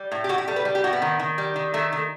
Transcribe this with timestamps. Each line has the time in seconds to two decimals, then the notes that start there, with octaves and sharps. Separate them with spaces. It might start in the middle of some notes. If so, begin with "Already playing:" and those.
Already playing: G3
0.12 A2
0.24 G4
0.29 A2 F#4
0.38 G4
0.48 G3 A4
0.56 B4
0.65 G3
0.75 G4
0.84 A2 F#4
0.93 B3
1.02 D#3
1.19 D#3
1.38 G3
1.56 D#3
1.74 D#3 A3
1.93 D#3